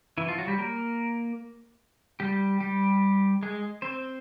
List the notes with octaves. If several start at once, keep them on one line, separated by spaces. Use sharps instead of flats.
E3 E4
F3 F4
F#3 F#4
G3 G4
A#3 A#4
G3 G4
G3 G4
G#3 G#4
C4 C5